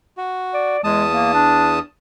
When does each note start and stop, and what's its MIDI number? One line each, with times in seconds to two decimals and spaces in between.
0.17 0.77 66
0.54 0.83 74
0.84 1.79 40
0.84 1.04 56
0.84 1.79 81
0.84 1.79 87
1.11 1.32 58
1.34 1.82 62